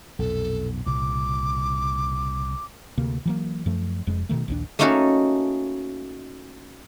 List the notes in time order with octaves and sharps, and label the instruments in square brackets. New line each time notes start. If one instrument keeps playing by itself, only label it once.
[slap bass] B1 F2 A#2 [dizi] A4
[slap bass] C2 A#2 C#3 [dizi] D6
[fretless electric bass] D2 C3 A#3
E3 F#3 A#3
F#2 F3 A3
F1 F2 G#3
B2 D3 D#3 A3
A#1 D#2 D4
[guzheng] A3 A#3 C#4 D#4 F#4 A4